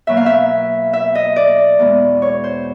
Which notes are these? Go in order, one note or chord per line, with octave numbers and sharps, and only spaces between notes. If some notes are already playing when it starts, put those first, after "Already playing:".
B2 F#3 A#3 E5
F5
E5
E5
D#5
D5
E2 B2 G#3
C#5
C5